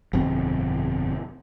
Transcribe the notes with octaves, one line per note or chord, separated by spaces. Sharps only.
G1 F2 B2 C4